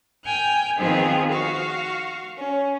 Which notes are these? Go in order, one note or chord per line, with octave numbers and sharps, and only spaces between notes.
G5 G#5 F6 G6
D#3 F3 B3 C4 F4 G#4
F#4 F5 C#6
C#4